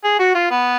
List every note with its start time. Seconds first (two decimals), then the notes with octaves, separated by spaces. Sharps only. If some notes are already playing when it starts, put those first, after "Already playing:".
0.04 G#4
0.19 F#4
0.35 F4
0.51 B3